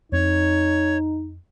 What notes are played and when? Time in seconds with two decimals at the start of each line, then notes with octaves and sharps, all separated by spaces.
0.12 F2 C4 D#4 C#5